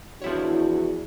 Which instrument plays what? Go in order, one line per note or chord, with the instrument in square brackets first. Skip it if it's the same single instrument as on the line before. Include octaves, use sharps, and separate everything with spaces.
[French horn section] E2 D4 F#4 [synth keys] F3 E4 C#5